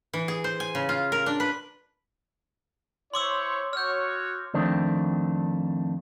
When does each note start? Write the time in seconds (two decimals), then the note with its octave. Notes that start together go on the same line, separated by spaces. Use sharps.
0.13 E3
0.28 G#4
0.44 C5
0.60 G#5
0.75 C#3
0.89 F4
1.12 A#4
1.26 D4
1.40 B4
3.14 E4 C5 C#5 C6 D6 E6
3.73 F#4 C#5 F6 G6
4.54 F2 D#3 A3 C4 D4